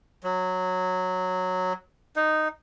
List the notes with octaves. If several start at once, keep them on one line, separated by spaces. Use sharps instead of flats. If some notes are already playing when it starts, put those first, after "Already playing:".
F#3
D#4